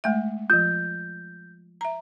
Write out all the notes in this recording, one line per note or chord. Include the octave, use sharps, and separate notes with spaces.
G#3 A3 E5
F3 F4 G6
E5 A#5